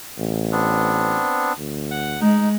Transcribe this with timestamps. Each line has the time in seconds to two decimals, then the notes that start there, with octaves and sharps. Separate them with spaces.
0.18 A1
0.52 B3 C4 D4
1.58 D2
1.91 F#5
2.21 G#3 D#4